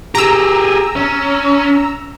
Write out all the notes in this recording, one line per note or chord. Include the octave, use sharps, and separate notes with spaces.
G4 G#4 A#5 E6
C#4